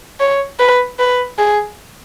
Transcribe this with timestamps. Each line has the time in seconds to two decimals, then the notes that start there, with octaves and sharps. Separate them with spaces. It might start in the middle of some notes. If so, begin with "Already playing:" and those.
0.20 C#5
0.60 B4
0.99 B4
1.39 G#4